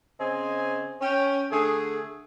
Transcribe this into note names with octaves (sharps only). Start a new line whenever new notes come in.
C#3 C4 D#5 G#5
C#4 G5
D3 A3 G#4